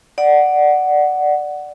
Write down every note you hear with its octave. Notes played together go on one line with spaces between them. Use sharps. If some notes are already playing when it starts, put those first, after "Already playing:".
D5 F#5